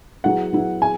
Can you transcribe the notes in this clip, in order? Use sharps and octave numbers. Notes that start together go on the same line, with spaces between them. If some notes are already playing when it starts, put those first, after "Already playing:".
F#3 B3 E4 G#4 F#5
F#3 B3 E4 G#4
G#4 G#5